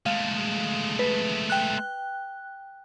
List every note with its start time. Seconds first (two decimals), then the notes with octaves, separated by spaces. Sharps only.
0.06 G#3 A3 F5
0.99 B4
1.50 G5 F#6